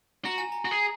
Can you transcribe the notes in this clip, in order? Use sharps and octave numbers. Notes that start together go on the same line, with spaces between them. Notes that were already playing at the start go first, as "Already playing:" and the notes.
F#4 A#5
G#5
A#5
F#4
G#4